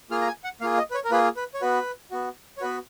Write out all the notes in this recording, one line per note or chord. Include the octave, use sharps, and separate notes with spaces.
A#3 F4 G#4 F6
A#5
G#5
F#5
A#3 F4 G#4 F5
D#5
B4
C#5
A#4
A#3 F4 G#4 B4
B4
C#5
B3 F#4 B4
B3 F#4
C#5
B3 F#4 B4